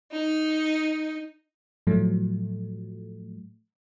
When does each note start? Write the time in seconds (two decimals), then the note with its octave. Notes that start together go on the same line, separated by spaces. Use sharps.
0.12 D#4
1.87 A2 F3 F#3 A3